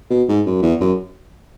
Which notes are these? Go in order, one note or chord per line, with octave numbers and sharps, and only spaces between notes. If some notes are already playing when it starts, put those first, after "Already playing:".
B2
G#2
F#2
E2
F#2